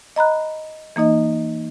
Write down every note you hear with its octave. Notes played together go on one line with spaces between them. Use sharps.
D#5 A#5 B5 F#6
E3 A#3 D#4 D#5